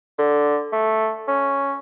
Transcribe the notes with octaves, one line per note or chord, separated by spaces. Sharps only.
D3
A3
C#4